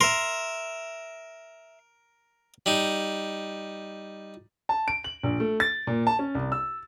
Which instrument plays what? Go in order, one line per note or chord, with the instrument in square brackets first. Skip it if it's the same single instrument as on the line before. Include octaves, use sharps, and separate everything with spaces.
[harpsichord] A#4 [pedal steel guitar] E5 C6
[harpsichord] G3 D#4
[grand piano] A5
D7
F#7
A#1
A3
A6
A#2
A5
C#4
C2
E6